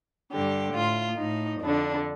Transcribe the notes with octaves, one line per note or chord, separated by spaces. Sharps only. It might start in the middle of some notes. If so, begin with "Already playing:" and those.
G2 D3 G4
A2 F4
A2 D#4
F2 D3 D4